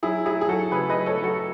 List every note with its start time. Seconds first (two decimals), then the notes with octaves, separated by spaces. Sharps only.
0.03 F#3 E4 G#4
0.25 F#3 E4 G#4
0.41 G#4
0.49 F#3 F#4 A4
0.72 C#3 G#4 B4
0.90 B4 D#5
0.95 F#3
1.06 A4 C#5
1.18 F#3
1.24 F#4 A4